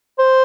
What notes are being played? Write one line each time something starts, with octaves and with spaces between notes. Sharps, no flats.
C5